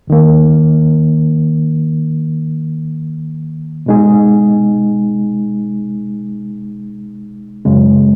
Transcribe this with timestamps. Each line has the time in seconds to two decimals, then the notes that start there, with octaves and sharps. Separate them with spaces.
0.07 D#2 D#3 A#3
3.86 B2 G#3 D#4 G#4
7.65 F#2 C#3 G#3